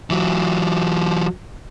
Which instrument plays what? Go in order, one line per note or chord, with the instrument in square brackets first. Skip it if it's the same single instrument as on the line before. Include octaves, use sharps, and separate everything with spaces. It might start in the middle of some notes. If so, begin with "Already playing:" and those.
[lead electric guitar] E3 F#3